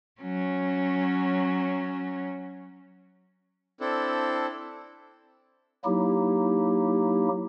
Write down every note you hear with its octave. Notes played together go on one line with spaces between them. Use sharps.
F#3 C#4
C4 D4 E4 A4
F#3 A#3 D#4 E4 G4